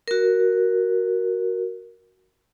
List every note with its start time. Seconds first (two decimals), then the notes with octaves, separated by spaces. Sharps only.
0.08 F#4 A#4